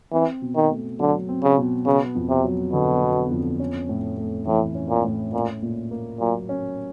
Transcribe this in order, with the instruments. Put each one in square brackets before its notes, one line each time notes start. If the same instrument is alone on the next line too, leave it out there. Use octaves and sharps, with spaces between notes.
[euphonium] E3 [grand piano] C4
[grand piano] B2
[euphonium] D#3
[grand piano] A3
[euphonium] D3 [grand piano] F#3
[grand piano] C4
[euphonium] C#3
[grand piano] B2
[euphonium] C#3 [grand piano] B3
[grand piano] F2
[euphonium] C3
[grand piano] F#3
[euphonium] B2 [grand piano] D3
[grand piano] B3
F2
C#4
A2
A3
[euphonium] A2 [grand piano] E3
[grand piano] C#4
[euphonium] A#2
[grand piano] A2
[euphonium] A#2 [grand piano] C#4
[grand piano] A#2
A#3
[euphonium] A#2 [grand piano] F#3
[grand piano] C#4